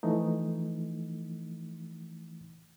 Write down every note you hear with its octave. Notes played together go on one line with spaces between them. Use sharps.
E3 F3 A3 D#4